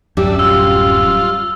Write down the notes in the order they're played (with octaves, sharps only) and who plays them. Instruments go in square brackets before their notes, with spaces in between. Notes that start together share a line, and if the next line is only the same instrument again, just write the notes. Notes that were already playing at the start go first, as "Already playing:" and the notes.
[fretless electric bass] D1 F#2 [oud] G3 [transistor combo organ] D4 E5
[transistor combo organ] F4 [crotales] E6